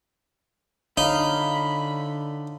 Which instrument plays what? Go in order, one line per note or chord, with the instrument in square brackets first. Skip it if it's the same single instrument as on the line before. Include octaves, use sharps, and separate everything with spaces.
[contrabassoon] D3 [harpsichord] D#4 [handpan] C#5 F5 [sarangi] B5